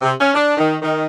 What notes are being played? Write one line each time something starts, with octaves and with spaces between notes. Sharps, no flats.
C3
C#4
D4
D#3
D#3